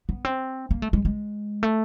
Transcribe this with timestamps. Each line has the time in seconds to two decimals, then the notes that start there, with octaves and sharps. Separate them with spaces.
0.09 B3
0.25 C4
0.71 A#3
0.82 A3
0.93 G#3
1.05 G#3
1.63 A3